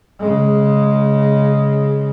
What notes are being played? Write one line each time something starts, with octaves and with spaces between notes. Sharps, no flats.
C#3 G#3